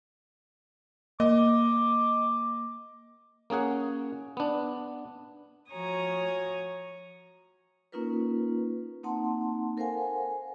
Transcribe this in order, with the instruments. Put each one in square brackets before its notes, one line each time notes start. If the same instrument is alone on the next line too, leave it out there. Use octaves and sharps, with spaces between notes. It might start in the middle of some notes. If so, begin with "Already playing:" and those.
[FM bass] A#3 [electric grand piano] D#5 [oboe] D6
[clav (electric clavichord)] A#3 C#4 G#4 F#5
B3 D4
[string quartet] F3 F#4 C#5 G#5 A#5 D#6
[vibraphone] A#3 C#4 D#4 F4 A#4 B4
A#3 C4 D#4 F#5 A5 C6
A4 A#4 C5 F5 F#5 G#5